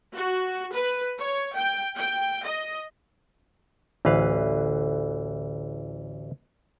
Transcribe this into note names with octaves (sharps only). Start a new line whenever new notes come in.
F#4
B4
C#5
G5
G5
D#5
A1 D2 E3 B4 F5